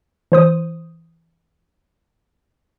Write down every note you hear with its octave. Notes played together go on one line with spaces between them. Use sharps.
E3 C5 D#6